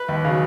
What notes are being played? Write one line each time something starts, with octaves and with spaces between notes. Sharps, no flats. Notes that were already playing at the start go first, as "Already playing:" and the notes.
Already playing: B4
D#2
C#3 F#3